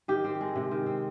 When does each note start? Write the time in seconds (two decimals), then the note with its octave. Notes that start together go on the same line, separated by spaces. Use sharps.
0.08 D#3 G4
0.24 C4
0.41 G#3
0.56 C3
0.71 D#3
0.86 C4